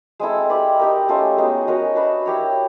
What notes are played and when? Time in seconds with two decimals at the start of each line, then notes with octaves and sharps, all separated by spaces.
0.19 G#3 C4 E4 A4
0.49 E4 G4 B4 D5
0.79 D#4 G4 A#4
1.08 A3 C#4 F4 A4
1.37 G#3 B3 D#4 F#4
1.67 C#4 F#4 A#4 D#5
1.96 D4 F#4 B4 E5
2.26 E4 G4 A#4 C#5